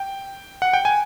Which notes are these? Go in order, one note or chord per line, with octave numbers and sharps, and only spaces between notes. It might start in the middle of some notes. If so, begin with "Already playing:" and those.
Already playing: G5
F#5
G5
G#5